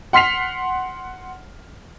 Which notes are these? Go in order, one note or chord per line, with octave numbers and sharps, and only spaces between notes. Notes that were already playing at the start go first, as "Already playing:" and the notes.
F#5 C6 F6 B6 C7 F7